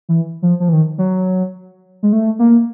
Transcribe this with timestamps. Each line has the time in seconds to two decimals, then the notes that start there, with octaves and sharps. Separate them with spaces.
0.09 E3
0.42 F3
0.60 F3
0.69 E3
0.73 D#3
0.98 F#3
2.03 G#3
2.13 A3
2.39 A#3